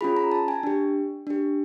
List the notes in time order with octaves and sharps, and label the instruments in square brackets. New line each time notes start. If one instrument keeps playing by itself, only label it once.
[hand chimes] C#4 F4 G#4 B5
A#5
A5
G#5
D4 G4
D4 G4